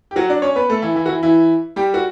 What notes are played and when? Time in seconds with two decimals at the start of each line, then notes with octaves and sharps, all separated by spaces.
0.11 G4
0.16 F#3 F#4
0.29 D4 D5
0.42 C#4 C#5
0.56 B3 B4
0.70 A3 A4
0.82 E3 E4
0.95 E3 E4
1.06 F#4
1.09 E3 E4
1.23 E3 E4
1.76 G3 G4
1.94 F#4